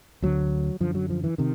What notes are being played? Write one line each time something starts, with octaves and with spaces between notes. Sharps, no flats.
D2 D3 F#3
F#2 D3 F3
F#3
F3
E3
C3 D#3